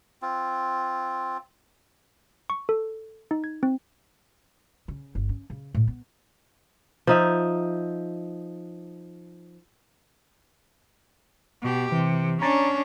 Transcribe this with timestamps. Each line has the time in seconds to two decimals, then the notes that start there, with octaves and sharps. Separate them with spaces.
0.22 C4 F4
2.50 C#6
2.69 A4
3.31 D#4
3.44 G#6
3.63 C4
4.88 C#3
5.15 G1
5.29 C#4
5.50 C#3
5.74 A2
5.87 B3
7.07 F3 D#4 E5
11.62 B2 G4
11.92 C3 E3
12.42 C#4 D4 A#5 A6